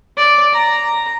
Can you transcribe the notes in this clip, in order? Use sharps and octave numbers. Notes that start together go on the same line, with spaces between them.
D5
A#5